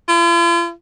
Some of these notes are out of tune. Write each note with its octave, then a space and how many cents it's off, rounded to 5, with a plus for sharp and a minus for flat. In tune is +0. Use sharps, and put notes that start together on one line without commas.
F4 -45